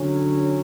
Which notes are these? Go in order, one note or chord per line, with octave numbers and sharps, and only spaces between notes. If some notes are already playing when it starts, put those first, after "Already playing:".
Already playing: D3 F#3 C#4